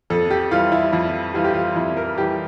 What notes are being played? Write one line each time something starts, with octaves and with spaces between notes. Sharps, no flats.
F2 A4
G4
E3 G3 F4
E4
F2 E4
E3 G3 F4
G4
F4
F2 E4
A#4
E3 G3 G4